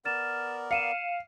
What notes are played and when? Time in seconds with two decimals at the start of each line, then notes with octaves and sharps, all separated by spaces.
0.05 B3 A#4 D5 F6 A6 E7
0.71 F5 C#7 D#7 E7